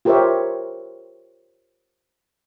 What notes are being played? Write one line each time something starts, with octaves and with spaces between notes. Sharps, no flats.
F4 G4 A#4 C5 C#5 E5